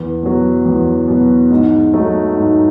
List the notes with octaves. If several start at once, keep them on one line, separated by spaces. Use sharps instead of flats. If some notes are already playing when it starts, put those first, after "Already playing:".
Already playing: E2
B2 F#3
E2
B2 F#3
G#2
F#3 A3 D#4
G#2